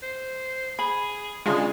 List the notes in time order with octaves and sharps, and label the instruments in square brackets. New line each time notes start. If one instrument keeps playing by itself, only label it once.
[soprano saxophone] C5
[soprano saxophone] G#4 [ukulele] B5
[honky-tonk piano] C#3 D4 F4 [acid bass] G#3 [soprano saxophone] G#5